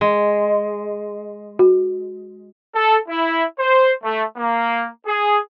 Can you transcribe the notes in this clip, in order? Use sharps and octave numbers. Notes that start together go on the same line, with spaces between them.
G#3
F#4
A4
E4
C5
A3
A#3
G#4